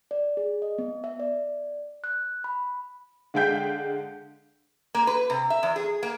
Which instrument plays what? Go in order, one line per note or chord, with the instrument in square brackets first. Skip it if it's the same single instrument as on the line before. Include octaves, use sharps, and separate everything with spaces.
[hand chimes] D5
G#4
D#5
B3
E5
D5
F#6
B5
[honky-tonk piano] D3 G#3 F5 G5 G6 B6
[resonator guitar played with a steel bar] A#3
B4
C3
E5
E2
G#4
A#3